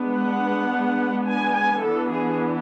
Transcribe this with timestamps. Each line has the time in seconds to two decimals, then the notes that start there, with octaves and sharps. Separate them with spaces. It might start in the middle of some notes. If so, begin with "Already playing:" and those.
Already playing: G#3 B3 D4
0.12 F#5
1.26 G#5
1.54 G#5
1.82 E3 B3 D4 A4
2.10 G#4